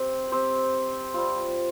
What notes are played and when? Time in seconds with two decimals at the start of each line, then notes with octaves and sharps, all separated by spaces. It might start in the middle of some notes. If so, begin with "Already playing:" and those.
Already playing: C4 G4 C5
0.32 C4 G4 C5
1.14 G3 C4 F4